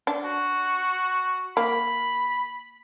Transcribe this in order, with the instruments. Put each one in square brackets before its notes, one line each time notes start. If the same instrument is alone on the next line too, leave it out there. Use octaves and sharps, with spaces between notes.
[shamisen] D4
[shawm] F#4
[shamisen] A#3 [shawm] B5